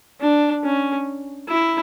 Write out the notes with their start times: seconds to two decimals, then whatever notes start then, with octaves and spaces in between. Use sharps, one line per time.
0.20 D4
0.63 C#4
1.49 E4